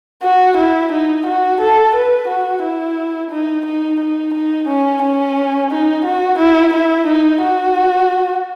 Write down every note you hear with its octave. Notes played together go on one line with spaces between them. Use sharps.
F#4
E4
D#4
F#4
A4
B4
F#4
E4
D#4
D#4
D#4
D#4
C#4
C#4
D#4
F#4
E4
E4
D#4
F#4